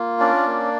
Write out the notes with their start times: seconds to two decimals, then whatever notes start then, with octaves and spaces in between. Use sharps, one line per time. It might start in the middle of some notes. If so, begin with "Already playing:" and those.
Already playing: A#3 F4
0.19 C#4 D4 D5
0.46 A#3